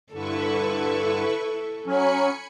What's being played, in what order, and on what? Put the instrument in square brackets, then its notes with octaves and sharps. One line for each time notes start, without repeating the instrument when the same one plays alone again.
[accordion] G2 D3 [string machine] E4 B4 C#6 [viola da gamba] A4
[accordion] F#3 C#4 [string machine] G#5 B5 C#7